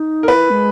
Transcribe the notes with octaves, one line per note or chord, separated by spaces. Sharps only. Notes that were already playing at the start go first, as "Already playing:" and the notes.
Already playing: D#4
A#4
E4 B4
G#3